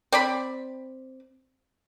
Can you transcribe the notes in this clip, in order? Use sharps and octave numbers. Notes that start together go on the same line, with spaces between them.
C4 D5 B5